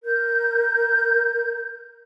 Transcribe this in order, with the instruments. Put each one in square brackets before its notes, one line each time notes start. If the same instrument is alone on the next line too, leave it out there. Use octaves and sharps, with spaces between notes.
[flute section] A#4 G6